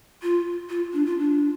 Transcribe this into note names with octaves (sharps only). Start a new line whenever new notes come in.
F4
F4
D4
F4
D4